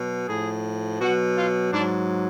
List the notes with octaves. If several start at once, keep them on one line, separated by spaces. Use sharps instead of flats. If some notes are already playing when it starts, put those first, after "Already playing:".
Already playing: B2 F#3
A2 F3 G#4
B2 F#3 F#4
F4
G#2 F#3 D4